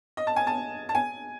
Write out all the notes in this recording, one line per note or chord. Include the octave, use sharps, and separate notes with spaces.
D#5
A5
G#5
A5
A5
G#5